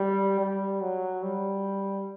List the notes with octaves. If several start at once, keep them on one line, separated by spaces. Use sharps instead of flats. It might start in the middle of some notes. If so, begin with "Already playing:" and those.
Already playing: G3
G3
F#3
G3